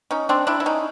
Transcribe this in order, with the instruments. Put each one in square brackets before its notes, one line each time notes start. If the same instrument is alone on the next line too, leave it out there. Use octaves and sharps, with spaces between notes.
[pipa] C#4 D#4
C4 D4
D4 E4
E4
C#4 D#4